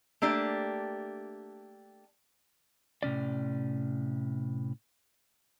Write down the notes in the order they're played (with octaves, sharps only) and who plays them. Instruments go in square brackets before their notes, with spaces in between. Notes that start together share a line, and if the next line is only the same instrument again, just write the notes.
[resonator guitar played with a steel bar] A3 A#3 D4 G4
[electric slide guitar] A2 C3 C#4 D5